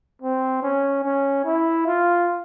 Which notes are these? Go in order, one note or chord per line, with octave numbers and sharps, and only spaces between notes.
C4
C#4
C#4
E4
F4